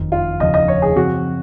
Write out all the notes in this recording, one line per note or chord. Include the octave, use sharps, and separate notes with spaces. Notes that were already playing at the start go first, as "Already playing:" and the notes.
Already playing: F#1 F2 D#3
F4
F1 D#2 C#3 F3 D#5
D#5
C#5
G#4
F#2 C#3 F3 C4 F#4